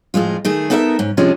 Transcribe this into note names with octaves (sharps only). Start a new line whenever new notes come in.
F2 A2 G#3 F4
D#3 A3 G#4
B3 D#4 A4 A#4 C#5 E5
G#2 C#4
C3 F3 G#3 C#4 D4